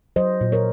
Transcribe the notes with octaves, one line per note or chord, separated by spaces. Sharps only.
F#3 C5 D#5
A#2
A#4 C#5